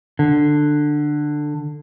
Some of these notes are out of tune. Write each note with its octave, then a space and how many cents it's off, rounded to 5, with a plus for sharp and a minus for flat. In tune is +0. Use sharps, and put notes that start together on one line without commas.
D3 +15